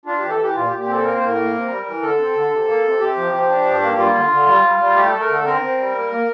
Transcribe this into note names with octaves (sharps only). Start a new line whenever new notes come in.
D4 F4
E3 G4
A4
E3 G4
A#2 F4
G4
A#2
G4
C4 A4
A#3 A#4
C5
A2 A#4
A#3
C3
G3
E3
D3 A4
C4
D3
C3
A#3
C3
C3 G4
F3
F3
D4
G2
A#3
G3 F4
D3
D3
G3
G3
G3
A3 G4
A3 A4
A#4
D3 A4
C4 A#4
C4
G3
A#3
A#3